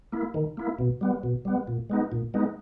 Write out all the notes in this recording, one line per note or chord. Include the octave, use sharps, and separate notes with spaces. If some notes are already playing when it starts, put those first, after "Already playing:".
A#3 E4
D#3
A#3 E4
B2
G3 B3
B2
G3 B3
A#2
G#3 B3 D#4
A#2
G#3 B3 D#4